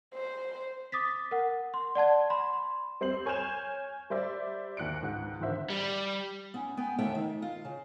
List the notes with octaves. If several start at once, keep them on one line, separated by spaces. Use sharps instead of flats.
C5
D6 D#6 A6 B6
A#4 F#5
C6
D5 F#5 A5 G#6
B5 C6
G3 C4 C5 C7 F#7
C#5 G#5 F6 G6 E7 F7
G3 C5 D5 E5
D#2 F#6 C#7 D7
C#2 G#2
A1 D3 D#3 C5 E5
G3
B3 C#4
B3 G5 G#5
D#2 D3 A3 B3 E5 G5
D#3
F4
C#3